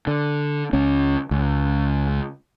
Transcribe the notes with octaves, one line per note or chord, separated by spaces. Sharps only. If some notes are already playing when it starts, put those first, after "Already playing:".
D3
C#2 C#4
C#2